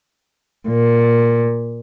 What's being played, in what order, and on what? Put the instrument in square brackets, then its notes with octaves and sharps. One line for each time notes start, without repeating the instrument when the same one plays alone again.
[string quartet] A#2